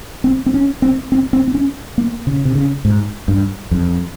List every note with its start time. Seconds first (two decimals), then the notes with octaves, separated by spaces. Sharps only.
0.24 C4
0.46 C4
0.54 C#4
0.82 C4
1.12 C4
1.33 C4
1.48 C4
1.55 C#4
1.98 A#3
2.27 C#3
2.45 C3
2.56 C#3
2.85 G#2
3.28 G2
3.71 F2